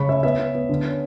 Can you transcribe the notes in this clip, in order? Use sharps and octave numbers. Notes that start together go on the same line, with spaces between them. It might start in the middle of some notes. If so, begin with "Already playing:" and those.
Already playing: C#3 B5 C#6
C#4 E5
B3 E5
B3
B3
D3
C#4